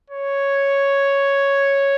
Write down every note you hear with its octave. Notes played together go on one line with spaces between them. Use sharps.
C#5